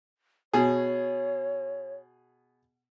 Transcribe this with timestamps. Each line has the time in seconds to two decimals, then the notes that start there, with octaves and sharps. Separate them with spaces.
0.53 B2 G#4 C#5